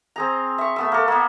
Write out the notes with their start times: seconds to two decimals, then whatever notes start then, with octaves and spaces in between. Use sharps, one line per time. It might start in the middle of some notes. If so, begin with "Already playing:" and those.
0.16 C4 G#4 A#5
0.58 E5 C#6
0.76 A3 B3 E6
0.92 A#3 A4
1.08 A#3 B3